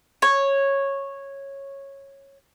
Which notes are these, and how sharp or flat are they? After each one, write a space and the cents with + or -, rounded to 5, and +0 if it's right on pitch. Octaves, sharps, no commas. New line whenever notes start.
C#5 -10